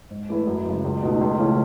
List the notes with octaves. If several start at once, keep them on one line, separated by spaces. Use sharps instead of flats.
G#2
E3 A3 E4 B4
F#2
C#3 G#3
C#2
B2 A3 D#4
C#2
C#3 E3 A3 C#4